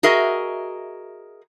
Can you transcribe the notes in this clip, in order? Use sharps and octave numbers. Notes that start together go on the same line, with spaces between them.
F#4 G#4 A#4 D#5 E5